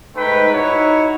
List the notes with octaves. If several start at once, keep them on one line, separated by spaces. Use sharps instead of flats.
G#2 A3 D#4 B4 G5
D#4 E4 F#4 C#5